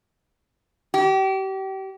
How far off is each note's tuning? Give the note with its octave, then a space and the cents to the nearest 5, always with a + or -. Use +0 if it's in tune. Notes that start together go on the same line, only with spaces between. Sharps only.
G4 -35